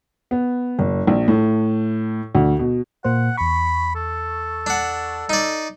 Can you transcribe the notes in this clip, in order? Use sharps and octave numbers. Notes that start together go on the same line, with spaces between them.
B3
F#1
A#1
A2
D2
B2
A#2 A#3 C5 F#5
E2 B5 C#6
A4
D4 F#5
D#4 D5